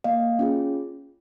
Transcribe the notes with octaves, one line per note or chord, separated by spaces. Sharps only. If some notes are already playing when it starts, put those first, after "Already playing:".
A#3 D#5 F5
C#4 F4 G#4